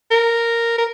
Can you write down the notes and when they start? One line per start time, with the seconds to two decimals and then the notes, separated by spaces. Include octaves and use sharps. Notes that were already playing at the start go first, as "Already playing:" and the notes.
0.11 A#4
0.78 A#4